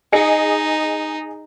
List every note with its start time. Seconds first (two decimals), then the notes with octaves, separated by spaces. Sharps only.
0.13 D#4 G#4 D#5 C#7